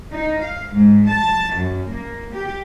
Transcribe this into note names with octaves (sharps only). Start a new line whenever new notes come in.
D#4
F5
G#2
A5
F#2
A#3
G4